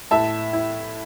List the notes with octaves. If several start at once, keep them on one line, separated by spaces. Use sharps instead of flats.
A2 E5 A5
E4